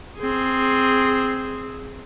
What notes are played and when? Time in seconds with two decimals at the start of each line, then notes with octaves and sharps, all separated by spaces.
0.18 C4 G#4